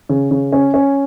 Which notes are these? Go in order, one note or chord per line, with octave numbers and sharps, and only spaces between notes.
C#3
C#3
C#4
C#4